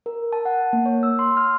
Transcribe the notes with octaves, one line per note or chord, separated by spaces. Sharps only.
A#4
A5
F#5
A#3
C#5
E6
C6
F6